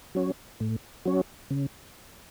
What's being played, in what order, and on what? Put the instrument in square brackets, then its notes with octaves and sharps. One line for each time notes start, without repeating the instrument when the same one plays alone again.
[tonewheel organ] F#3 C#4
A2
F#3 C#4
C#3